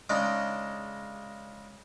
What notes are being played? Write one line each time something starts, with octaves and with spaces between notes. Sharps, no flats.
C#3 G#3 D4 D#4